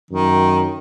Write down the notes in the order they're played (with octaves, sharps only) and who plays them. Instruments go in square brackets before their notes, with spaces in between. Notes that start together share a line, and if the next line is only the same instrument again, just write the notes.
[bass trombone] F#2 [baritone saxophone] D#3